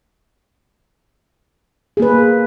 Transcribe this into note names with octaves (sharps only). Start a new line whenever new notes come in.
A#3 G#4 B4